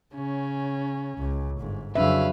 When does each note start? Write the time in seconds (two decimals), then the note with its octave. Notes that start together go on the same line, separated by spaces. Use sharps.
0.15 C#3 C#4
1.18 C#2
1.58 G1 G#2
1.95 F2 C#3 F#3 D4 B4 E5 F5